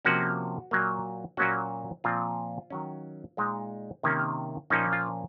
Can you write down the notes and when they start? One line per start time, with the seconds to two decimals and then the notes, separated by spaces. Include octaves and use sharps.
0.05 C3 F3 A#3 C#4 F#4
0.71 A#2 F#3 A#3
1.37 A#2 F#3 A#3 C#4 F#4
2.04 A#2 F3 C4 F4
2.70 D#3 F#3 C#4
3.37 A#2 G#3 D#4
4.03 C3 D#3 A#3 C#4
4.70 A#2 F3 A#3 C#4 D#4
4.93 F4